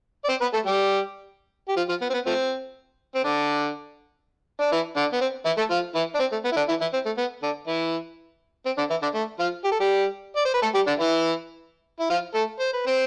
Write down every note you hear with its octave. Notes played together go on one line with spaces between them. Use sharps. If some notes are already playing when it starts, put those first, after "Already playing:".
D5
C4 C5
B3 B4
A3 A4
G3 G4
G4
F3 F4
F3 F4
B3
C4
B3
F3 A3 C4
C4
D3 D4
D4
E3 E4
D3 D4
B3
C4
E3 E4
A3 A4
F3 F4
E3 E4
D4
C4
A3
B3
E4
D3 D4
E3 E4
E3 E4
C4
A3
B3
D3 D4
E3 E4
C4
D3 D4
E3 E4
D3 D4
A3
F3 F4
G4
A4
G3 G4
D5
C5
B4
A3 A4
G3 G4
D3 D4
E3 E4
E4
F3 F4
A3 A4
C5
B4
C4 C5